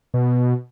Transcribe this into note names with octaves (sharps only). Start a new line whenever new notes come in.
B2